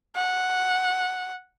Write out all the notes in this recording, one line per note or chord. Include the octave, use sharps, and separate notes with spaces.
F#5